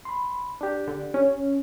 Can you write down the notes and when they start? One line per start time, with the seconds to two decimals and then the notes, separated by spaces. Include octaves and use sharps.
0.05 B5 C6
0.61 D4 G4
0.88 D3
1.14 C#4